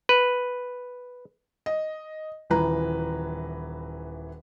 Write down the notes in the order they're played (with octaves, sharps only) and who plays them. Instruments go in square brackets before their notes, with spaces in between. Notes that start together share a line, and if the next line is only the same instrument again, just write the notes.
[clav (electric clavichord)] B4
[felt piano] D#5
D#1 E3 B4 A#5